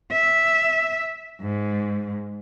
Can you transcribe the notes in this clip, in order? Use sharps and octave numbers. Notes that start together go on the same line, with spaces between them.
E5
G#2